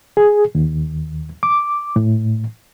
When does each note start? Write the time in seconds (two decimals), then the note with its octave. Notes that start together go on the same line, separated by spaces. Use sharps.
0.17 G#4
0.55 D#2
1.43 D6
1.96 A2